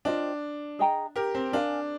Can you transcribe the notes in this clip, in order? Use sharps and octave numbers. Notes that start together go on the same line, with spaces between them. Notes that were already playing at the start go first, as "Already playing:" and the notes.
D4 F4 C5 D#5 G5
G#4 D#5 G5 A#5
G4 A#4
C4
D4 A#4 F5 G#5